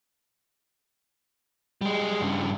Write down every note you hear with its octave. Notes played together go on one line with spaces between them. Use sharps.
G3 G#3
G2 C#3